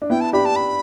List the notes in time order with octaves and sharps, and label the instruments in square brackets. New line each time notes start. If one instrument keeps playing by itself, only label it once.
[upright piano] D4
[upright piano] B3 E4 [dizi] G5
[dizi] A5
[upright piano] D4 G4 [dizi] B5
[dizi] A5
B5